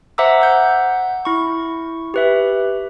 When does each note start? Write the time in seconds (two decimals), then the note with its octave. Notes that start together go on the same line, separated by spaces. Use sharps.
0.18 C5 E5 F#5 A#5 D6 E6
0.42 F#5 G6
1.25 E4 C#6
2.14 G4 B4 E5